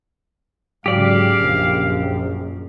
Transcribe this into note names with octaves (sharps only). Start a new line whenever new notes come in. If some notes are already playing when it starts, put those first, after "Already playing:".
G#2 C#3 F#3 G4 D5 F5
A#1 F#2 C#3